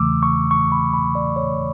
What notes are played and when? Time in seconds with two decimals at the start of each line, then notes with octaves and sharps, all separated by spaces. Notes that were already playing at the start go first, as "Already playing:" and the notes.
Already playing: E2 C#3 E3 A3 D6 E6
0.23 C#6
0.51 C#6
0.72 B5
0.94 B5
1.15 D5
1.36 C#5